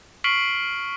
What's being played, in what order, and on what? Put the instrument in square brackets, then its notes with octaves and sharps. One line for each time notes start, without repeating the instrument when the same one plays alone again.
[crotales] C#6 F6 B6 C7 D7 F#7